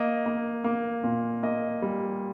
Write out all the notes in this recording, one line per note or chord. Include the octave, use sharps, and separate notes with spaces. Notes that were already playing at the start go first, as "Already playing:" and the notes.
Already playing: A#3 D#5
A#3
A#3
A#2
A#3 D#5
G3